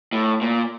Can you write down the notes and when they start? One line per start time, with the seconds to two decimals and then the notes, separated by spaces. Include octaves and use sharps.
0.13 A2
0.41 A#2